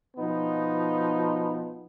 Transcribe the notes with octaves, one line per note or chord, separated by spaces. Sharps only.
B2 F3 B3 D#4